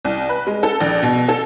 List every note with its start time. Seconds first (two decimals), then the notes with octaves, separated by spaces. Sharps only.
0.05 C2
0.29 B4
0.47 G#3
0.63 A4
0.80 A#1
1.02 B2
1.28 A4